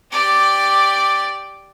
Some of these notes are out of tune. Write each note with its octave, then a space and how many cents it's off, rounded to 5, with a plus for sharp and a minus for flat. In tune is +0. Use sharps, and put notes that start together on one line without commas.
G4 +0 D5 +0